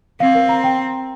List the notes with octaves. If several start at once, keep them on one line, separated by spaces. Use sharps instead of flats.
C4 F5
A#4
A#5
G5